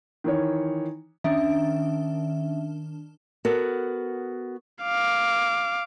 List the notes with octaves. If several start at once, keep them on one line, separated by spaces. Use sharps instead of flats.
D#3 E3 C#5
D#3 C#4 D4 E5
B3 F#4 A4 A#4
F5 D6